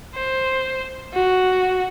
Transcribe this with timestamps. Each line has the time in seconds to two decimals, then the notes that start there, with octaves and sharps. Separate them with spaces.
0.15 C5
1.14 F#4